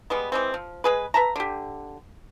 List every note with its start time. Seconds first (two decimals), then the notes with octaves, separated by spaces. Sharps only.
0.10 G3 G#3 B3
0.32 E3 G#3 C4
0.54 F3
0.84 G#3 G#4 B4
1.14 B4 E5 A5 A#5
1.36 D3 G4